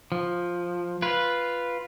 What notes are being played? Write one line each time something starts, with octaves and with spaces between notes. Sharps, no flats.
F3
F4 B4